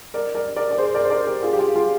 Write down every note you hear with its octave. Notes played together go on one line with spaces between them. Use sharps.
A#4 D5
A#4 D5
A#4 D5
D5
G#4 C5
A#4 D5
C5
A#4 D5
G4 A#4
F4 G#4
G4
F4 G#4
F4 G#4